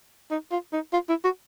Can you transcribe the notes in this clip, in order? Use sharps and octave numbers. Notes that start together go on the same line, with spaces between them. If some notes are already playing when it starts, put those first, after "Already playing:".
D#4
F4
D#4
F4
E4
F#4